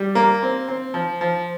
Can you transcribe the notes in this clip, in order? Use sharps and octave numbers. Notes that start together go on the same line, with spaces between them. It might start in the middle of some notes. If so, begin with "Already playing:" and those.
Already playing: G3
A#3
C4
C4
F3
F3